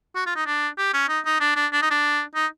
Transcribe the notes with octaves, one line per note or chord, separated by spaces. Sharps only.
F#4
F4
D#4
D4
G4
C#4
D#4
D#4
D4
D4
D4
D#4
D4
D#4